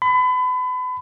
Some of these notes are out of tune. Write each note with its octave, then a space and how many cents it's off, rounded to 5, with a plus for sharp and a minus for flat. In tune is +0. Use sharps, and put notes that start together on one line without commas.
B5 +35